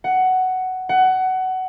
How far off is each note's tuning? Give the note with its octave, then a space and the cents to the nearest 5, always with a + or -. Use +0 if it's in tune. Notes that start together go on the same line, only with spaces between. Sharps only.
F#5 +10
F#5 +20